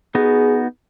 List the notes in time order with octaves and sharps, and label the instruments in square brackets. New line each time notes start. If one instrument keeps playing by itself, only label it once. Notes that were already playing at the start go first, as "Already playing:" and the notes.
[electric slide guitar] B3 D#4 F#4 [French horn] G#4